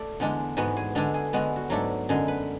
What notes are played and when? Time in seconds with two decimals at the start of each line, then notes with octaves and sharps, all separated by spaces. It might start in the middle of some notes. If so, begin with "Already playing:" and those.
Already playing: A3 D5
0.20 E2 D3 G#3 D4
0.57 G#2 G#3 B3 F#4
0.77 G#4
0.95 D3 G#3 D4 G#4
1.14 G#4
1.33 D3 G#3 B3 F#4
1.56 F#4
1.70 G#2 F#3 A3 D4
2.09 F#2 D3 G#3 G#4
2.28 B4